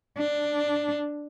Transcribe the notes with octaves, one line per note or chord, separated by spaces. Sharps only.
D4